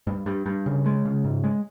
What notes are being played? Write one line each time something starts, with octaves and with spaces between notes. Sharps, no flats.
G2
G2
G2
C#3
G#3
C#3
G#2
G#3